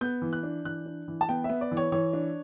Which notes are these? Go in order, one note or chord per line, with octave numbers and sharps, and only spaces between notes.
B3 G6
E3
F#6
D4
E3 F#6
D4
E3
A5
B3 G5
E5
B3
D5
E3
C#5
E3 C#5
D4